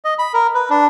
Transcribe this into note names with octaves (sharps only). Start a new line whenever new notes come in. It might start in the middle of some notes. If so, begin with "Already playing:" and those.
D#5
B5
A#4
B4
D4